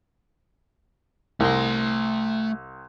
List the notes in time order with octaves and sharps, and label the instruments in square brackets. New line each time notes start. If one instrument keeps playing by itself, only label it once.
[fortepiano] C2 [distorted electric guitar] A3 C6